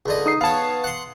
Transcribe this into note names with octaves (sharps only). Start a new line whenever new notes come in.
C#2 D3 D#5
D#4 D#6 C7
B3 C#5 F5 A5
F#5 C6